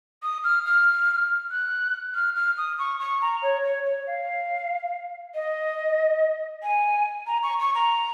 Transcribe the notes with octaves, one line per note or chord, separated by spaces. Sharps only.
D#6
F6
F6
F#6
F6
F6
D#6
C#6
C#6
A#5
C#5
C#5
C#5
F5
D#5
G#5
A#5
C#6
C#6
A#5